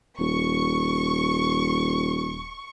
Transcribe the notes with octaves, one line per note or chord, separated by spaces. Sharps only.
D#1 C#6